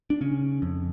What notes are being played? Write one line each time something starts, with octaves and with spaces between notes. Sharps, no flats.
D4
C#3 C#4
F2